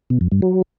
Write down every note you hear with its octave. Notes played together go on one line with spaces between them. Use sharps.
B2
F2
G2
F#3